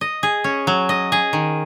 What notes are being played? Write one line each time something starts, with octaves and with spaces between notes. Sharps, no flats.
D#5
G#4
C#4
F#3
D#5
G#4
D#3